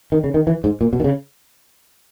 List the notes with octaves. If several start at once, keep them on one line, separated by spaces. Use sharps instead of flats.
D#3
C#3
D#3
E3
G#2
A#2
B2
D#3
C#3